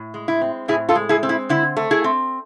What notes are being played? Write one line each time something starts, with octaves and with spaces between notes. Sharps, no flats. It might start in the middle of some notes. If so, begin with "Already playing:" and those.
Already playing: A2
G#3
E4
C4
A2 E4 G#4
F4 A4
G#3
E4 G#4
C4
E4
D3 E4
A3
E4 G#4
C4